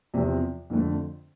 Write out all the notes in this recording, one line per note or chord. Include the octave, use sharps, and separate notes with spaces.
E2 C3 F3
F2 D3 A3